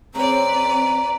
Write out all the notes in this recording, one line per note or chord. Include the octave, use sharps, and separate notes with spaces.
F3 C4 C#4 G#4 B4 D5 A#5